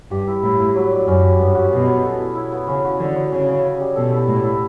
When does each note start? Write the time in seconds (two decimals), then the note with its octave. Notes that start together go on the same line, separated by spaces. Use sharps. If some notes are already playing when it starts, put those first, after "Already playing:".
0.11 G2 G4
0.27 E4
0.43 A2 E4
0.60 E4
0.76 F#3
0.91 D5
1.07 F#2 C#4
1.23 G4
1.39 G2 B3
1.55 F#4
1.71 B2 B3
1.87 C#5
2.04 A4
2.20 E4
2.35 E4
2.52 B3
2.68 C#3 C#4
2.84 F#4
3.00 D3 C#5
3.15 C#5
3.32 C#3 C#4
3.48 C#5
3.65 C#5
3.81 G3
3.96 B2 A4
4.12 E4
4.28 A2 E4
4.44 E4